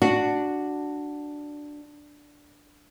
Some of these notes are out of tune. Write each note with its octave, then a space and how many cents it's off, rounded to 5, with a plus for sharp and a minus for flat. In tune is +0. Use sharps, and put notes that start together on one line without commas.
D4 +0 F#4 +0